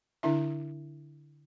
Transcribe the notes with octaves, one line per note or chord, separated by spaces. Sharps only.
D3 D4 E4 E5